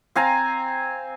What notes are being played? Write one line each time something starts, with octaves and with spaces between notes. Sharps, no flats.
C4 F5 G#5 A#5